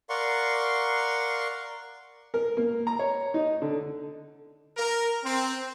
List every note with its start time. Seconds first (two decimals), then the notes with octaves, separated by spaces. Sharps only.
0.09 A#4 D5 F5 F#5 C6 C#6
2.34 A#4
2.57 A#3
2.87 A#5
2.99 C#5
3.34 D#4
3.62 D3
4.77 A#4
5.24 C4